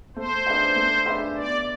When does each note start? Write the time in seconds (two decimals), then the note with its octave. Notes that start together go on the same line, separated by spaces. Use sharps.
0.16 A3 C5
0.47 D4 G#4 B4 E5
0.76 A3
1.06 D4 G#4 B4 E5
1.37 B2 D5